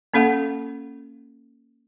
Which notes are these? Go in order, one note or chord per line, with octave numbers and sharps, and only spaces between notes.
A#3 C#4 A4 F5 F#5